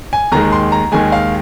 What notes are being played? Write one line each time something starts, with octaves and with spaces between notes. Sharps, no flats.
G#5
D#2 D#3 G#3 A#5
C6
A#5
D#2 D#3 G#3 G#5
F5